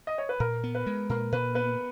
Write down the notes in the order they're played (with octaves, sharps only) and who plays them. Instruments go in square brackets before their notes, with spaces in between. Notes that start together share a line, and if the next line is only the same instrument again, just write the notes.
[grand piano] D#5
C#5
B4
[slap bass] A#2 [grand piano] A#4
[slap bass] B3
[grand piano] B4
[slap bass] G#3
[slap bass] A#2 [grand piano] A#4
[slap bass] A#2 [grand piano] B4
[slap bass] B3 [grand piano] B4